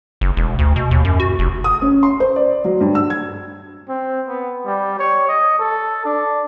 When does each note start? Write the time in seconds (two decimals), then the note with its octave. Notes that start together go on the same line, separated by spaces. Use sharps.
0.21 F#1
0.37 E1
0.59 D2
0.76 B2
0.91 D#2
1.05 F#2
1.20 F#4
1.39 F1
1.64 D#6
1.82 C#4
2.03 C6
2.20 C5
2.36 D5
2.65 F#3
2.81 G2
2.95 E6
3.10 G#6
3.89 C4
4.28 B3
4.65 G3
4.99 C#5
5.28 D#5
5.59 A4
6.05 D4